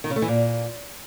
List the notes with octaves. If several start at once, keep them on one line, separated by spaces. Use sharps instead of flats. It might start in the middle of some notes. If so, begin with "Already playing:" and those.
D#3
C#3
A3
E3
A#2